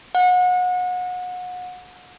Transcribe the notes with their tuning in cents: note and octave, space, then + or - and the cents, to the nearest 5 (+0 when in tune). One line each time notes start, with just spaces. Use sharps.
F#5 -30